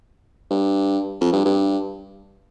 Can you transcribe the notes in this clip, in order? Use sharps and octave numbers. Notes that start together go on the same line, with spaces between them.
G2
F2
G2
G2